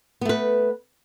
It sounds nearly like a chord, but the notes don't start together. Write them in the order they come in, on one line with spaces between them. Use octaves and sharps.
B3 A3 B4